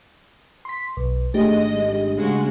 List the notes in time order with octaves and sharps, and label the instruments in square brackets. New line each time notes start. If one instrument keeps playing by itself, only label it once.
[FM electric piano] C6 B6
B1
[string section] G#1 G#3 D#5 [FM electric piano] A3 D4 G4
[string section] C#3 G#3 F#4